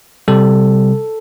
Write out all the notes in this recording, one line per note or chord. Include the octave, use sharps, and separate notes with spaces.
C3 G3 A4